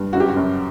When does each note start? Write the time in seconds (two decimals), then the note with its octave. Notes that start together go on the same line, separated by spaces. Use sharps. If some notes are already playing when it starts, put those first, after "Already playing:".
Already playing: G2
0.13 F#2 F#4
0.20 G4
0.29 F#4
0.36 F#2